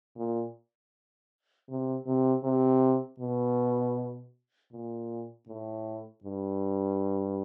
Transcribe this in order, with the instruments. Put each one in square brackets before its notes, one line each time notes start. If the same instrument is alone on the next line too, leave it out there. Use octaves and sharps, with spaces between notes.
[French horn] A#2
C3
C3
C3
B2
A#2
A2
G2